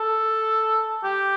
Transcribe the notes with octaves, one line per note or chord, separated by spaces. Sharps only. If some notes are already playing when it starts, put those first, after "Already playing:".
Already playing: A4
G4